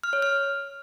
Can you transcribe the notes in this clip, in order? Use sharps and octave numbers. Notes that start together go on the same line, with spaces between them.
F6
C#5
F6